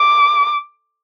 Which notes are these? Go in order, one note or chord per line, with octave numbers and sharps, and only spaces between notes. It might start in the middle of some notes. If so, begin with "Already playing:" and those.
Already playing: D6